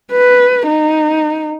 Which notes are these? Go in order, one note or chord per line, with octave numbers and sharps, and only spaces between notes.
B4
D#4